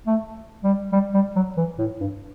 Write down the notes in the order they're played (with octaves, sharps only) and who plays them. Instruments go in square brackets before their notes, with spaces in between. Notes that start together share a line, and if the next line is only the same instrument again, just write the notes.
[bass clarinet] A3
G3
G3
G3
F#3
E3
A2
G2